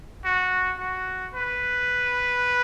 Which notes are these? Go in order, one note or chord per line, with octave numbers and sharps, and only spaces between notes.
F#4
F#4
B4